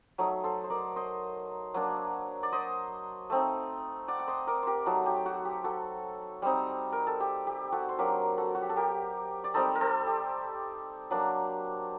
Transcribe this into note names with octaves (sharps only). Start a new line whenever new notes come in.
F#3 A3 D#4
A4 C5
C5
A#4 D5
C5 D#5
F#3 A#3 D4
D5
C5 D#5
A3 C4 D#4
D5 F#5
F#5
C5 D#5
A#4 D5
G4 A#4 C5
F#3 A3 D#4 F#4 A4
G4
F#4
G4
F#4 A4
G3 C4 D#4
A#4
A4
G4
G4
F#4 A4
C5
F#3 A#3 D4 G4 A#4
F#4 A4
F#4
G4
A4
G4 A#4
D5
G3 C4 D#4 A4 C5
A#4
A4 C5
G4
F#3 A#3 D4